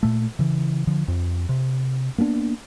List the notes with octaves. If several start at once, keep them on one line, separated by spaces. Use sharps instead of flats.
A#2 A3
C#3 E3
D3 F3
F2
C3
A#3 B3 C#4 D4